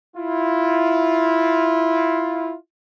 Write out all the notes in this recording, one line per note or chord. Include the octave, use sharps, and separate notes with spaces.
E4 F4